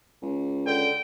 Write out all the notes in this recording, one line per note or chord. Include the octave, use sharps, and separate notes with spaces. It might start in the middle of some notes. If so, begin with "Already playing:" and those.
C#2
D3 G5